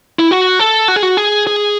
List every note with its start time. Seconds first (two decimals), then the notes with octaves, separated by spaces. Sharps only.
0.19 E4
0.31 F#4
0.60 A4
0.88 F#4
0.96 G#4
1.03 F#4
1.17 G#4
1.47 G#4